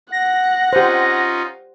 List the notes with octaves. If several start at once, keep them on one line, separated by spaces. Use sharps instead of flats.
F#5 A#6
C#4 D#4 F4 G4 C5